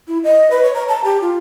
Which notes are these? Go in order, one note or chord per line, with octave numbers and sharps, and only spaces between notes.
E4
D#5
B4
C#5
A#5
A5
G4
F4